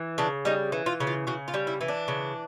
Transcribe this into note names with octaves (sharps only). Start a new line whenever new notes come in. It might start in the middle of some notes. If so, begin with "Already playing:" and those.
Already playing: E3
C#3 D4
G3 D#4
E3
F4
C#3
F4
C#3 F#4
F4
G3
E4
E3
D4
C#3